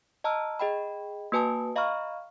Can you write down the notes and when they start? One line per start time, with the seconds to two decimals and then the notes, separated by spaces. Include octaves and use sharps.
0.24 D#5 A5 A#5 E6 F6
0.59 G#4 D#5 G5 B5
1.32 A#3 F#4 B4 G#5 A5 D#6
1.76 D#5 F5 A#5 B5 C#6 F6